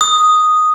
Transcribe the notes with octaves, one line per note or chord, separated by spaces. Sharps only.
D#6